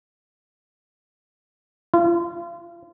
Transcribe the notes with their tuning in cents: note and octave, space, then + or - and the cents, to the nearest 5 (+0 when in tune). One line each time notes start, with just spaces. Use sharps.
F4 -35